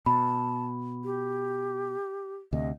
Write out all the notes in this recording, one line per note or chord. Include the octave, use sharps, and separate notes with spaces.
B2 A5 B5
G4
D2 C3 D#5